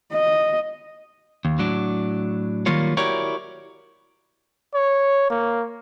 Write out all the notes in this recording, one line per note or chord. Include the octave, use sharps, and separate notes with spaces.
D#5
D#2
A2 F#3 D4
D#3 F#3 G3 A#3 F4 C#5
E4 F#4 G4 A#4 C#5 D5
C#5
A#3